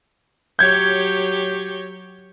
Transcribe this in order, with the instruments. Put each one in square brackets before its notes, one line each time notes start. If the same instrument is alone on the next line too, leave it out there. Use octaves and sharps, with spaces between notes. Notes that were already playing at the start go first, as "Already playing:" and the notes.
[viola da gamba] F#3 G4 C#5 [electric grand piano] G6 G#6